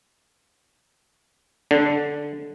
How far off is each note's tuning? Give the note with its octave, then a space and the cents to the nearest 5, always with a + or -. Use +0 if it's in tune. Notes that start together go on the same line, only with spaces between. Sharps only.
D3 -5